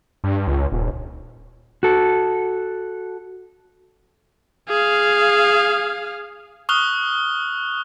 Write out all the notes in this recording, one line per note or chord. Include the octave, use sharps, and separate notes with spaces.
G2
C#2
D#1
F#4 A4
G#4 F5
C#6 D#6 F6 F#6 F7 G7